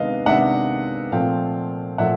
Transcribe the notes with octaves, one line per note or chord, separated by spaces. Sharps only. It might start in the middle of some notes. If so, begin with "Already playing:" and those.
Already playing: C3 D#3 G#3 B3 D4 D#5 F5
C3 D#3 G#3 B3 D4 E5 F#5
A#2 F3 A3 C4 F5 G5
A#2 F3 A3 E5 F#5